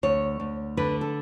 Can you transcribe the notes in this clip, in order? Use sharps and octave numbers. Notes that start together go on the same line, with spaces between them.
D2 C#5
D2
D3 B4
A4